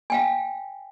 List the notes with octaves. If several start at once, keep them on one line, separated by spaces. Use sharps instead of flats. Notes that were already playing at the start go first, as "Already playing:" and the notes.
F5 G5 G#5